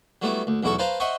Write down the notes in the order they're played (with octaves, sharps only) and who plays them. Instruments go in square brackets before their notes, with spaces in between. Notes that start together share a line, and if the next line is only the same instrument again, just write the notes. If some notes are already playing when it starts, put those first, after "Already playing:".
[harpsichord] F#3 G3 A3 B3 E4
D2
B1 E2 E4 F#4 A4 C#6
B4 C5 F5 A5 A#5
C5 D#5 E5 F#5 C#6